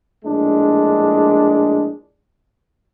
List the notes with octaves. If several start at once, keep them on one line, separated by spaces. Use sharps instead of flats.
A#1 A2 G#3 D4